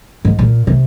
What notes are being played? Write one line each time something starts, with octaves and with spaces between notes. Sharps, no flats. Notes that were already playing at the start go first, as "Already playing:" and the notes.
G#2
A#2
C3